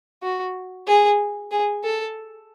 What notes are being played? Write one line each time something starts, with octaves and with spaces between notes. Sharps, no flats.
F#4
G#4
G#4
A4